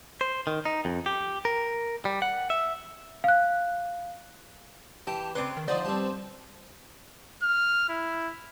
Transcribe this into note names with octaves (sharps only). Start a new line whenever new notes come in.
C5
D#3
D#4
F2
G4
A#4
G3
F#5
E5
F5 F#6
E3 G4 A5
C#3 C4 B4 D5 C6
D#3
D3 F3 D#4 C5 D5
G2 G3 C4 A5
F6
E4